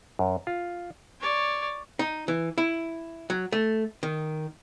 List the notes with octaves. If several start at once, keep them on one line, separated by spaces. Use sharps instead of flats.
F#2
F4
C#5 D5
D#4
E3
E4
F#3
A3
D#3